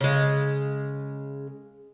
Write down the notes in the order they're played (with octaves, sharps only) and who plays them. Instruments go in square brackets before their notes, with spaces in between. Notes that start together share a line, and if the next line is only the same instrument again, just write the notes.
[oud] C#3 G#3